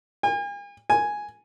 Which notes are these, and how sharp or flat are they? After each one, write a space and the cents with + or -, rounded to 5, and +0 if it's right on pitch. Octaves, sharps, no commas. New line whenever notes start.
G#5 -45
G#5 +0